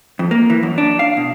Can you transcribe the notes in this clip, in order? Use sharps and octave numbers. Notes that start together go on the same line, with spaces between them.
F2
A#3
E3
F#2
D4
F5
B2